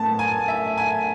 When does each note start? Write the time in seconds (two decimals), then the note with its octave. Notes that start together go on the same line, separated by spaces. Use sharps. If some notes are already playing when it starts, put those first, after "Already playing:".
Already playing: A2 B3 A5
0.19 G#5
0.48 E5
0.77 G#5